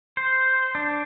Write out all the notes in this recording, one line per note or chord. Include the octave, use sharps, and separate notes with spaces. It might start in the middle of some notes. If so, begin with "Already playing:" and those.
C5
D4